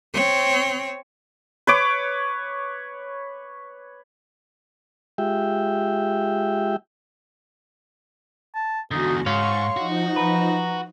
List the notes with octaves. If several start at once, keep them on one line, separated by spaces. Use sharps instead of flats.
C4 C#5
B4 C#5 D6
G#3 F4 G4 E5 G5
A5
E2 D3 D#4 F#4
G#2 C#5 F5 C6 C#6
F3 D#4 F#4
B4 A#5